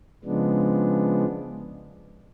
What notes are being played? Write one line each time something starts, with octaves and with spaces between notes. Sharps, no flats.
C#3 F3 G#3 B3 D4